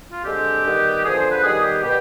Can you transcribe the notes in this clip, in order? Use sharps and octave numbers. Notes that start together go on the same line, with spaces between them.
F4
D3 G#3 C4 G4
D#3 G3 B3
D3 F3 B3 G#4
C5
B4
D#3 G3 B3 G#4
G4
B2 B3 G4